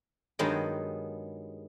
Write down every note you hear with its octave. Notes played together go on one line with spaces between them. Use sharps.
G2 D#3 F#3 G#3 B3 G5